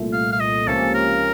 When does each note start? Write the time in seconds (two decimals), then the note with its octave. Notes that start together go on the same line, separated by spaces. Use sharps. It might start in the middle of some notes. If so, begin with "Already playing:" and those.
Already playing: C2 A#2 A3
0.13 F5
0.32 F5
0.40 D#5
0.67 C#2 C3 F3 A#3 C#4 A4
0.95 A#4